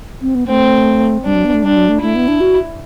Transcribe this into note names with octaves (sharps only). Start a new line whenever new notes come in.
C4
B3
A3 C4
G3 D4
F#3
B3
A3
G3 D4
F#3
A3
A3 E4
B3
D4
F#4